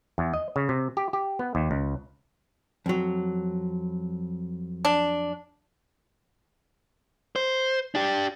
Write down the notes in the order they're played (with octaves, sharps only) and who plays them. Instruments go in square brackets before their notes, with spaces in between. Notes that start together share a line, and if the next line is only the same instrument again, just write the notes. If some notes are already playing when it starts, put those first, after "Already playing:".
[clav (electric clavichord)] E2
D#5
C#3
C3
G4
G4
B3
D#2
C#2
[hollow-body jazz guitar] F2 F#3
[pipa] D4
[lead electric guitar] C5
D4 G4